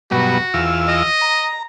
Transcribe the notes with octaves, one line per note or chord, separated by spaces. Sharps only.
G2 B2 F#3 F#4
E2 F4 E6
D#5
A#5